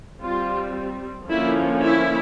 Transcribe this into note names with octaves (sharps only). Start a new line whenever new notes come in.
G3 C4 F4
D3 F3 A#3 C#4 E4
E4